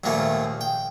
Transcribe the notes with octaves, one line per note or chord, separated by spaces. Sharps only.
A#1 D#2 G#2 D#3 A3 A#3
G5